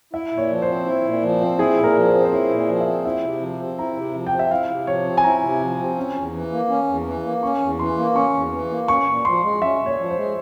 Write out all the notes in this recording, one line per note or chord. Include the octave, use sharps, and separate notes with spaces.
E4 E5
A#2
C#5
F3
C5
C4
E4
A#2
F3
C4
E4 G#4
A#2
A#4
F3
C5
C4
C5
E4 C#5
A#2
F3
E5
C4
E4 E5
C3
F3
C4
E4 A#5
C3
F3
G5
C4
E5
E4 F5
C3
F3 C#5
C4
G#5
E4 A#5
C3
F3
C4
C#4
E2
E3
A#3
C#4
E2
E3
A#3
C#4 C#6
E2
E3 C6
A#3
C#4 C#6
E2
E3
A#3
C#4 C#6
A#2
F3 C6
G#3
C#4 E5
A#2
C#5
F3
C5
G#3